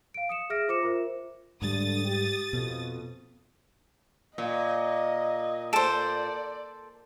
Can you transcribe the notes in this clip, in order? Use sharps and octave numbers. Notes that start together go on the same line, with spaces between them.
F5 D7
D#6 C#7 E7
G#4 E5 F6 A#6 D7
F4 C5 D6 A#6 C#7 E7
F4 A#4 C5 E5
G#2 D3 G3 D4 D#6 A6
G4
F2 B2
A#2 D#5
A4 C5 D5 A5 D7